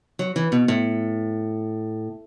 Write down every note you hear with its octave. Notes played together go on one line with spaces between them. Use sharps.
F#3
E3
B2
A2